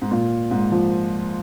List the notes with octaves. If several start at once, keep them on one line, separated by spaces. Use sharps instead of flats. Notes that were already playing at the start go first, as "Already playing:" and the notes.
G#2
A#2
G#2
F3